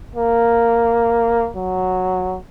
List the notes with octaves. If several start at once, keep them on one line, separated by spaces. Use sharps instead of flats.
A#3
F#3